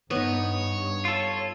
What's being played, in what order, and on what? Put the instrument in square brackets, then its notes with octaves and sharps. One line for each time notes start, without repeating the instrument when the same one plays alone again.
[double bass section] G2 [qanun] B3 D#4 [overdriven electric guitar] C#5
[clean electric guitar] F4 A4